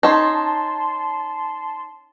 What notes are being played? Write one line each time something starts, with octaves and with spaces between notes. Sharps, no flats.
C#4 D#4 A5 C6